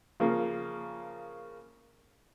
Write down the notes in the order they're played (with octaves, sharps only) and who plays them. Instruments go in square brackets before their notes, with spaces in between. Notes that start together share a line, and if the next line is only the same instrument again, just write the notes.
[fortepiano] C#3 F3 A#3